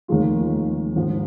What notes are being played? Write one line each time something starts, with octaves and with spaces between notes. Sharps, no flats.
F1 D#2 D#3 G#3 F4
G#1 G#2 F3